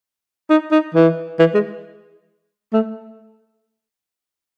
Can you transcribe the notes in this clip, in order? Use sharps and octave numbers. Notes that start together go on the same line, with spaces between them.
D#4
D#4
E3
E3
G#3
A3